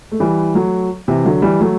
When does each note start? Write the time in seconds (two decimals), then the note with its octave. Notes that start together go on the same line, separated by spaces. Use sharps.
0.12 A3
0.20 E3 G3
0.55 F#3 A3
1.08 C3 E3
1.25 D3 F#3
1.42 E3 G3
1.61 F#3 A3